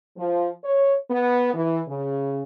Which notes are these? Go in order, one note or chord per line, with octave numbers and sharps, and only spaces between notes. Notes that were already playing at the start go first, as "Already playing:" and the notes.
F3
C#5
B3
E3
C#3